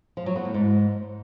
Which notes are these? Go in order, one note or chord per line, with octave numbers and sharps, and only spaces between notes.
F3
F#3
B3
A2
G#2